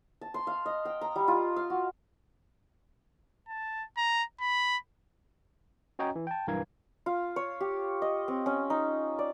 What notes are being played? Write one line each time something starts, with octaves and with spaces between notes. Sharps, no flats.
A5
C6
F5
D#5
G5
A#5
G3
F4
F5
F#4
A5
A#5
B5
C#4 F#4 C#5 D#5 G5 A#5
E3
G5 A5
B1 G2 E3 A#4 F5 G#6
F4
C#5
G4
D#5
C4
C#4
D#4
D5